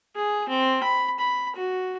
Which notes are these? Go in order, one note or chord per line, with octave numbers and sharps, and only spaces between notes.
G#4
C4
B5
B5
F#4